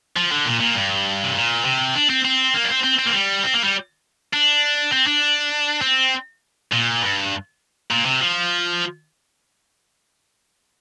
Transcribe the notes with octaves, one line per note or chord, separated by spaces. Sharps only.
F3
D3
A#2
A#2
G2
C3
A#2
C3
D4
C4
C4
A#3
D4
C4
C4
C4
A#3
G3
C4
A#3
G3
D4
C4
D4
C4
A#2
G2
A#2
C3
F3